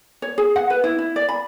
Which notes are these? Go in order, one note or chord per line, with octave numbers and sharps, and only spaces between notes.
C#5
G#4
F#5
B4
E4
E4
D5
B5